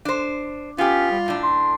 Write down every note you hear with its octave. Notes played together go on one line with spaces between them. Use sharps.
D4 C5
B3 C#4 F4 G4
G3
F#2 A2 D4
C6